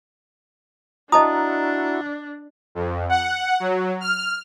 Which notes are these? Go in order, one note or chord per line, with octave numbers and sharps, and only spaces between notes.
D4 E4 F#4 D#5 A5 A#5 D#6
F2
F#5
F#3
F6